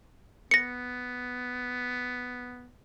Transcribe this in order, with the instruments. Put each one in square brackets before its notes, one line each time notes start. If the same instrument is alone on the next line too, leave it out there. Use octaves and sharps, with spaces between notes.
[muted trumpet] B3 [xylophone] A#6 C#7